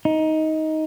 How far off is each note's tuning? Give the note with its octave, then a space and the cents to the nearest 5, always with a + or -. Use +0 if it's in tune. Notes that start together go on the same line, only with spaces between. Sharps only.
D#4 +15